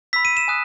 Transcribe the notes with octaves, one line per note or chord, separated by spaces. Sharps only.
B5 E6 B6
D#7
E7
G#5 D#6 F#6